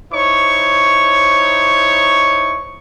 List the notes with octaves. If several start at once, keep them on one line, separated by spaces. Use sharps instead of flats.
D#4 E4 C5 C#5 C#6